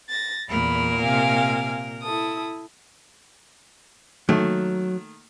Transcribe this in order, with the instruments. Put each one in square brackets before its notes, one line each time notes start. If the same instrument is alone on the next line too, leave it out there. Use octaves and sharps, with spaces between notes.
[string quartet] A6 A#6
[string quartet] E2 B5 [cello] A#2 A#4
[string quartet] C3 F5 G#5
E4 A4 D#6
[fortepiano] D#3 A3 A#3 [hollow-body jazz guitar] F#3